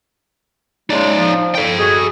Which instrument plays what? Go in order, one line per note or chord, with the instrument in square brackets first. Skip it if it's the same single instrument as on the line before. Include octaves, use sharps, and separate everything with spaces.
[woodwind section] C#3 F#3 G#3 [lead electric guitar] D#4 D5
[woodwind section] F3
[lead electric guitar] A4 G5
[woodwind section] G#3 F#4 G#4